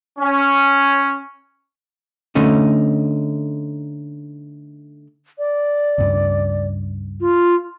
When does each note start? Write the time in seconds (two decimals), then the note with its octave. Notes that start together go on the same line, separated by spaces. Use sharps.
0.19 C#4
2.35 D3 A3 C#4 D#4
5.38 D5
5.98 C#2 G2
7.21 F4